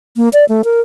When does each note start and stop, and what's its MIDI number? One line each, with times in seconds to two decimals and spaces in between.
0.17 0.29 58
0.33 0.45 74
0.49 0.62 57
0.64 0.80 70